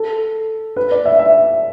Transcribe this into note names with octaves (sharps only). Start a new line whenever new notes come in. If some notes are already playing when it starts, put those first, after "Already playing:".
Already playing: A4
B4
D5
E5
E5